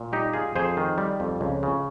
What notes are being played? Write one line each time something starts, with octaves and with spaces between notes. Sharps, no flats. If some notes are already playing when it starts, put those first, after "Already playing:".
Already playing: A#2
G3 D#4 G4
A#3 F4 G#4
F2 G#4 C5
D#3
G3
F2
C#2
C#3